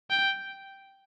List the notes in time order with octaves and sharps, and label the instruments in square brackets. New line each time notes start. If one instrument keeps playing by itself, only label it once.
[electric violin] G5